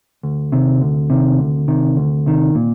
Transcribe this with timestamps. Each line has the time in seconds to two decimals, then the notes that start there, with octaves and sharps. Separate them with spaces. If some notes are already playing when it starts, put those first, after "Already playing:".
0.23 D2
0.52 C3 D#3
0.81 D2
1.10 C3 D#3
1.39 D2
1.68 C3 D#3
1.97 D2
2.26 C3 D#3
2.55 A#2